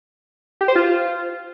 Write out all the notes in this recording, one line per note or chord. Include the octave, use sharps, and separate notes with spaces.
G4
C5
F4